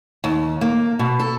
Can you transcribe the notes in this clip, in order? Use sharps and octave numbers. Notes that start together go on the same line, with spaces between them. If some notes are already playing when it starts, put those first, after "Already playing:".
D#2
A#3
B2
A4